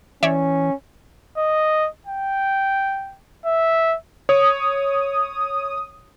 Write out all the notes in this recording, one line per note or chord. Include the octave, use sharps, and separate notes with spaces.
E3 C#4 C#5 D5 E5
D#5
G5
E5
C#5 D#6